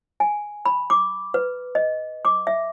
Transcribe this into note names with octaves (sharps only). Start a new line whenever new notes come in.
G#5
B5
D6
B4
D#5
D6
E5